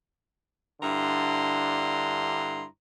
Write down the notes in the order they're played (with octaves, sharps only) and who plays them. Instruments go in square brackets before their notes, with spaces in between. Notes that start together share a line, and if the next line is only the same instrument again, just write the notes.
[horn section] G2 D3 E4 A#5 C6